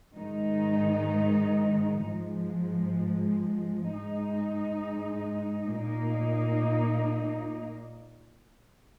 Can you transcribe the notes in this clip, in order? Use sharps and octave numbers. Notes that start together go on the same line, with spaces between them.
G#2 D#3 G#3 D#4
G#2 F3 G#3
G#2 G#3 D#4
A#2 A#3 D#4